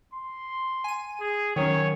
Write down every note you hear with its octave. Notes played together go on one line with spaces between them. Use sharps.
C6
G#5 D#7
G#4
D#3 F#3 C#4 C#5